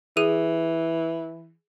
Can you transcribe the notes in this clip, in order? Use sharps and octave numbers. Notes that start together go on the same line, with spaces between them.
E3 G#4 D#7